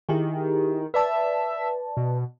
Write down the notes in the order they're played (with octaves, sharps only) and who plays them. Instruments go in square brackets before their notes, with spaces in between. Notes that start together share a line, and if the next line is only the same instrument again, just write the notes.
[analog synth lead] D#3 [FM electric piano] E4 G4 G#4
[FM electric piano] B4 D5 A5 [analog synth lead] E5
[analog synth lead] B2